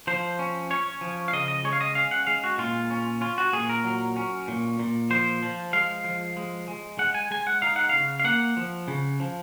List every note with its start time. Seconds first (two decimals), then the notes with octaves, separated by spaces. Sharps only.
0.07 F3 C5
0.39 C#4
0.70 C#4 C#5
1.01 F3
1.28 F5
1.33 C#3 D#5
1.48 D#5
1.64 G#3 C#5
1.73 F5
1.81 D#5
1.95 C#4 F5
2.11 F#5
2.27 G#3 F5
2.44 F#4
2.58 A#2 F4
2.90 C#4
3.21 C#4 F4
3.38 F#4
3.53 A#2 G#4
3.69 A#4
3.84 F#3
4.16 C#4
4.48 A#2
4.79 A#2
5.10 F3 C5
5.42 F3
5.73 G#3 F5
6.04 F3
6.37 G#3
6.68 G#3
6.98 G#3 F#5
7.14 G#5
7.31 G#3 G#5
7.47 F#5
7.62 D#4 F5
7.76 F#5
7.89 C#3 F5
8.20 F5
8.24 A#3 F#5
8.57 F3
8.88 C#3
9.20 F3